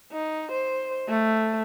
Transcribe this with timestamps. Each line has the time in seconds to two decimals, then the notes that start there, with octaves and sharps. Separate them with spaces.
0.12 D#4
0.52 C5
1.09 A3